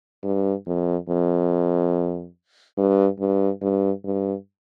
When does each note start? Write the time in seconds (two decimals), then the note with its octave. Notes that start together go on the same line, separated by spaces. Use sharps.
0.24 G2
0.67 F2
1.09 F2
2.78 G2
3.20 G2
3.62 G2
4.05 G2